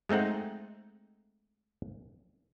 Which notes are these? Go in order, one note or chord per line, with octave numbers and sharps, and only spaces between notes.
G#3 A3 C4 D#4 F#5